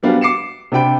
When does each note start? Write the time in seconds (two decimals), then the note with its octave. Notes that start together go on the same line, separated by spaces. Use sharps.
0.03 F#3 G3 B3 D4 G4 F5
0.21 D6 C7 C#7 E7
0.72 C3 D4 C5 G5 B5 D7